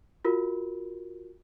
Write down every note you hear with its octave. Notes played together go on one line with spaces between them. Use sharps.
F4 F#4 A#4